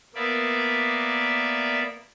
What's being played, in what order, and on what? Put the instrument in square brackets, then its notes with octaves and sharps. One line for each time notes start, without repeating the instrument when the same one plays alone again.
[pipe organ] A#3 B3 D5 E5